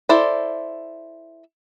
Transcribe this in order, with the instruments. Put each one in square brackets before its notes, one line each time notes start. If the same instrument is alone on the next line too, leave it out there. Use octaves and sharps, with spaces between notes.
[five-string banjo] E4 A4 C5 D5